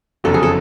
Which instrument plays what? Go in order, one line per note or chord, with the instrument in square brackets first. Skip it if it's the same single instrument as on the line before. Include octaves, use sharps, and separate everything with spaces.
[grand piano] F#1 F2 D3 F#3 [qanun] A4
[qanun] G#4
A4